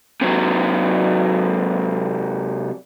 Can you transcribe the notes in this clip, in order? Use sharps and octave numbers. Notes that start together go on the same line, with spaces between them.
C3 F#3